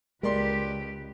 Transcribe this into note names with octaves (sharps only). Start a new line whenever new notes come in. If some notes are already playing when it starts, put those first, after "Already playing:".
C#2 G#3 G4 A#4 B4 D5 C6